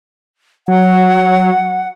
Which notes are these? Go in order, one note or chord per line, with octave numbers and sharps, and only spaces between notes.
F#3 F#5